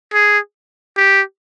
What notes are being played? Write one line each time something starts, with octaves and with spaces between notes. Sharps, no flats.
G#4
G4